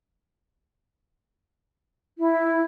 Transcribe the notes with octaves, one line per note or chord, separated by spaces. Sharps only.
E4